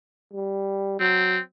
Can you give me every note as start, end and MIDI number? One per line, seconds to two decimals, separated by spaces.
0.33 0.99 55
1.00 1.40 54
1.00 1.39 60